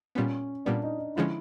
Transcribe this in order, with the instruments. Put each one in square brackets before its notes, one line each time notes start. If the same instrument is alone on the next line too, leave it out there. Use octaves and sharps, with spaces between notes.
[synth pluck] A#2 G3 B3 [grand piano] C#4
[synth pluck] A#2 G3 B3 [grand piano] D4
[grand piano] D#4
D#4
[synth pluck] D3 F3 G#3 C#4 [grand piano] E4